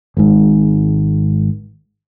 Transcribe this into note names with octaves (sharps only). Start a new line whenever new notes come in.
G#1 G#2